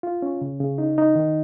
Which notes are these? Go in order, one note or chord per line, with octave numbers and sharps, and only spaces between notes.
F4
C#4
C#3
C#3
D#4
D#4
D#3